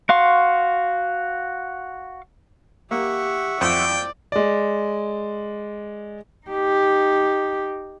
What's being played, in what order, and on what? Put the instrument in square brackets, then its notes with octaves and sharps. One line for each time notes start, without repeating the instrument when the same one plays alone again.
[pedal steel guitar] F#4 F5 C6 C#6
[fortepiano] A#3 [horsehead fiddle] G4 [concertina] E5 F#5 C#6
[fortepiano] F2 [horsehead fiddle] D5 [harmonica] G5
[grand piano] G#3 D5
[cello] D#4 G4